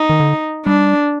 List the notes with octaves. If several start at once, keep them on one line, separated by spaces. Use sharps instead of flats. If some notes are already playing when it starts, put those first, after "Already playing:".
Already playing: D#4
D#3
D3
G3 D4